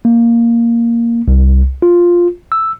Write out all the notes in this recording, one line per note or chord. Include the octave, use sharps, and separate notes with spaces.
A#3
C2
F4
E6